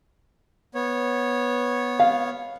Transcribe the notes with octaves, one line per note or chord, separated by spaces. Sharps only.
B3 C#5
F5